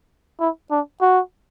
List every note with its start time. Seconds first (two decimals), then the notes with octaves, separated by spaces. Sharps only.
0.40 E4
0.71 D4
1.01 F#4